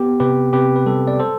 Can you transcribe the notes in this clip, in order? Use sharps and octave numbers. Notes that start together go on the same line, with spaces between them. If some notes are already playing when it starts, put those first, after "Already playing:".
Already playing: B3 G4
C3 G4 B4
C3 G4 B4
B4
G3 A4
D5
A4 C5